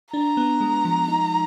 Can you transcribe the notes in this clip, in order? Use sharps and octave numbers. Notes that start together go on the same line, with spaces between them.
D4 A#5
B3
G#3
F3
D#4